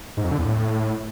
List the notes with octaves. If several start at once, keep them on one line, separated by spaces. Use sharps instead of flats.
G#2
F2
D3
E2
A2